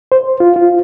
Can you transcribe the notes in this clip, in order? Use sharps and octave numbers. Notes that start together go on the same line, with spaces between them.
C5
F4
F4